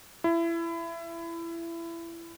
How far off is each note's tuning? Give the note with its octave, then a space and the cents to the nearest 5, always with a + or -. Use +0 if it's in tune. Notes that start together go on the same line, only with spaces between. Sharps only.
E4 +25